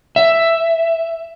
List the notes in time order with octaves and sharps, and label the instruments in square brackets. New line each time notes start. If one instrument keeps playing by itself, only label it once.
[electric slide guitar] E5